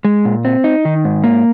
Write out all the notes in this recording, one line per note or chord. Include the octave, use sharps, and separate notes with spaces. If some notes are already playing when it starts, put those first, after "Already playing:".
G#3
A#2
C4
D#4
D#3
G#2
A#3